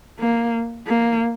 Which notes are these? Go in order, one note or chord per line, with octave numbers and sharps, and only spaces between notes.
A#3
A#3